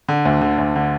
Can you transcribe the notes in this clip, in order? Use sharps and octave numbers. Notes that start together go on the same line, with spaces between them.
D3
D2
D3
D2
D3